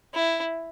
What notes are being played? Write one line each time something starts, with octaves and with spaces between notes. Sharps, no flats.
E4